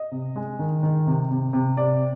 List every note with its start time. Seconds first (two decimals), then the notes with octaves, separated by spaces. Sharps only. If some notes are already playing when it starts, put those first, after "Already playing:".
Already playing: D#5
0.11 C3
0.36 G#3
0.59 D#3
0.83 D#3
1.07 C3
1.31 C3
1.53 C3
1.77 C3 D5